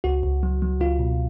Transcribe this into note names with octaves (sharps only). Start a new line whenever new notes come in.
C#2 F#4
C#2
F#3
F#3
C#2 F4
B2